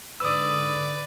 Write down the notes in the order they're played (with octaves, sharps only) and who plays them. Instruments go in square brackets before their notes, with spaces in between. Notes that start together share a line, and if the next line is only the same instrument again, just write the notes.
[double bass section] G#2 D3 [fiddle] B4 D5 [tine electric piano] D#6 E6